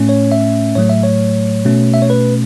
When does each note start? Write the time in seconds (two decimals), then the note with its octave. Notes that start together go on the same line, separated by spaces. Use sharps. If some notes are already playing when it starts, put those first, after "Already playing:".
Already playing: A2 A3 C#4
0.09 C#5
0.32 E5
0.76 A2 F#3 A3 C#5
0.89 E5
1.03 C#5
1.65 B2 A3 C#4
1.94 E5
2.02 C#5
2.10 B4